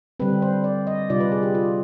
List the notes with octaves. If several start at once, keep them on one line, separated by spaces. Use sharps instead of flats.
D3 G3 C4 B4
C5
D5
D#5
C3 G3 D4 F4 D5
B4
G#4
G4
F4